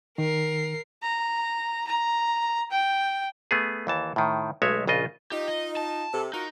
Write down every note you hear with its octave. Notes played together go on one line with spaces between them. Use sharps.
D#3 A#4 C7
A#5
A#5
G5
A3 B3 G#4
D#2 E3 A5
A2 D#3
B1 G#3 A3 C#5 E5
A#1 C#3 F4 D#5
D#4 F4 G4
D#5
A5
C3 A4
D#4 F4 F#4 A#4